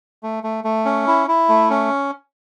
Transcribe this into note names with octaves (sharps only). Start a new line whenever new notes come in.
A3
A3
A3
C#4
E4
E4
A3
C#4